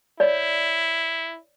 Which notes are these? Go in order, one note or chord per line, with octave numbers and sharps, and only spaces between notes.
E4 C#5 D5